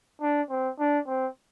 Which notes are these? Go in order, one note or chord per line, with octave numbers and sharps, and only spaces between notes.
D4
C4
D4
C4